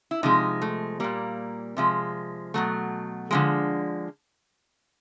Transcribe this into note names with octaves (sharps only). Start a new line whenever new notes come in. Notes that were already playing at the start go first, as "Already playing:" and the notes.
E4
C3 F3 G#3 D#4
A3
A#2 G3 A#3
C3 F3 G#3
B2 F#3 A3
D3 F3 G#3